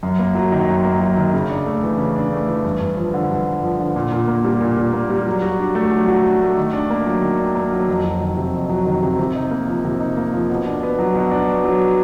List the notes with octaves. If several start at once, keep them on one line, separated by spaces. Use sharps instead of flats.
F#2
A#3
F#3
D#3
F#2
A#3
F#3
D#3
C#3
D4
A3
E3
C#3
D4
A3
E3
G2
G2
F3
D3
G2
G2
F3
D3
A#2
A#2
A#3
G3
A#2
A#2
A#3
G3
F#3
F#4
D4
A3
F#3
F#4
D4
A3
D#3
D4
A#3
F#3
D#3
D4
A#3
F#3
F2
F#3
D#3
C3
F2
F#3
D#3
C3
C3
D#4
A#3
F3
C3
D#4
A#3
F3
B2
D4
B3
F#3
B2
D4
B3
F#3